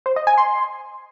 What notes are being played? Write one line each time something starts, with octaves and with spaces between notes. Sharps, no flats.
C5
D#5
G#5
C6